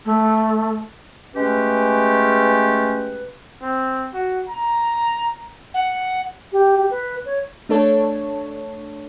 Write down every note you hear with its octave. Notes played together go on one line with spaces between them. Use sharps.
A3
G#3 A3 C#4 G4 B4
C4
F#4
A#5
F#5
G4
G4
B4
C#5
A3 D4 A4 C#5